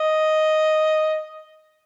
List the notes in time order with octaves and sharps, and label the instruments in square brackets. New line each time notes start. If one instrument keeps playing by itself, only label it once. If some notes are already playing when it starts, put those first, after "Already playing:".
Already playing: [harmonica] D#5